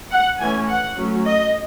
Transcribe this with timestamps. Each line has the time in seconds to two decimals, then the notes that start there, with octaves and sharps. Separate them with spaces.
0.11 F#5
0.39 E3 A3 C#4 G#5
0.68 F#5
0.97 F#3 A3 C#4
1.25 D#5